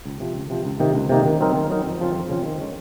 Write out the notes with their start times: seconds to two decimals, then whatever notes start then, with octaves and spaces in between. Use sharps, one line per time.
0.06 C#2
0.20 C3 F3
0.35 C#2
0.50 C3 F3
0.65 C#2
0.80 C3 D#3 A#3 D#4
0.95 C#2
1.09 C3 D#3 A#3 D#4
1.25 D#3
1.41 F#3 C4 D#4 A#4
1.54 D#3
1.69 F#3 C4 D#4 A#4
1.85 F2
2.00 C#3 F3 C4 F4
2.15 F2
2.30 C#3 F3 C4 F4
2.45 D#3
2.60 G#3 C#4